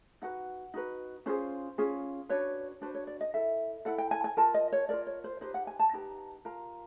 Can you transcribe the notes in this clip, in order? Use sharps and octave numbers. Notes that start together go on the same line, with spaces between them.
D#4 F#4 B4 F#5
D#4 F#4 B4
C#4 F4 G#4 C5
C#4 F4 G#4
D4 F#4 B4 C#5
D4 F#4 B4 C5
C#5
D5
D#5
E4 A4 E5
E4 A4 F#5
G5
G#5
G#5
F4 A#4 A5
D#5
C#5
F4 A#4 D5
C#5
C5
D#4 G4 B4 C5
F#5
G#5
A5
D#4 G4 B4 A#5
F4 A#4 A#5